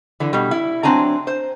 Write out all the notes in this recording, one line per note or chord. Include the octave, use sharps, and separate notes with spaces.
D3 E3
B2 G3
E4
F#3 C4 D4 G#5 A#5
C5